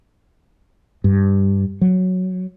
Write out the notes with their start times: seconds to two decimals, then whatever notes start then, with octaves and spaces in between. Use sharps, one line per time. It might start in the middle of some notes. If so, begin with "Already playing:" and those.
1.04 G2
1.81 F#3